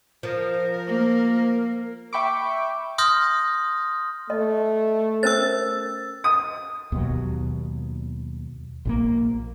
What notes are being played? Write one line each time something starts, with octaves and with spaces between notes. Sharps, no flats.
F3 A#4
A#3
E5 G5 B5 C#6 D6
C6 D#6 F6 G6 A#6
A3 D#5
C#4 A#4 C5 E6 A6
D#6
D#2 B2 F#3
A#1 D3 A#3